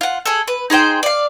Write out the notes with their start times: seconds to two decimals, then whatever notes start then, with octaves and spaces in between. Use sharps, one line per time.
0.01 F4 F#5
0.25 G#4 A4
0.48 B4
0.70 D#4 G#4 C5 G5
1.03 D5 F5